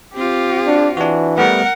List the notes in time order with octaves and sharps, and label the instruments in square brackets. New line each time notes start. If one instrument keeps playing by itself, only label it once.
[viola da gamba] C4 F4 [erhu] G4
[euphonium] D4
[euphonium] E3 [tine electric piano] D4 F#4
[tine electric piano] G3 A3 B3 [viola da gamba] A#4 [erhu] F#5